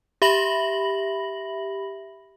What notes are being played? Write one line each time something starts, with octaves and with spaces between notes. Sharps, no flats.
G4 E5 B5 A#6 F#7